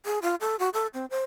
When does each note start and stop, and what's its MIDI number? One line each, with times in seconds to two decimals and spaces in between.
0.05 0.19 68
0.22 0.35 65
0.40 0.56 69
0.59 0.69 66
0.74 0.87 69
0.94 1.05 60
1.10 1.24 72